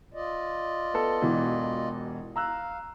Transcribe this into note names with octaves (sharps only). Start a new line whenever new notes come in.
F4 D5 D#5
B3 A4
E1 B2 E3
F5 A#5 E6 F#6